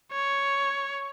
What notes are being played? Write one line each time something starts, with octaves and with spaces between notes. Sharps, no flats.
C#5